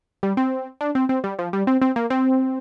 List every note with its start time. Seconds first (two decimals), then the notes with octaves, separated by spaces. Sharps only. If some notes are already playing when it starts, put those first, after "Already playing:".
0.23 G3
0.37 C4
0.81 D4
0.95 C4
1.09 C4
1.24 G3
1.39 F3
1.53 G3
1.67 C4
1.82 C4
1.96 A#3
2.10 C4